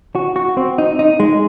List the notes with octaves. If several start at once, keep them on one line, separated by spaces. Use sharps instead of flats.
F#4
F#4
C4
D#4
D#4
G#3